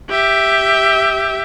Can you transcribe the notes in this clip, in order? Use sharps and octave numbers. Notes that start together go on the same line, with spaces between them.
G4 E5